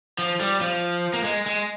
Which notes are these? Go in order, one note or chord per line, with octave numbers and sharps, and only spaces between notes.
F3
G3
F3
A#3
G#3
G#3